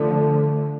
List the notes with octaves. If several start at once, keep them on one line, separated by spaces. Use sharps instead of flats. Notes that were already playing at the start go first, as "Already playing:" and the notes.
Already playing: D3 F3 A3